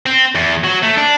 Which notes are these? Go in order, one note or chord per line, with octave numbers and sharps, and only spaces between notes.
C4
E2
F#3
A3
D4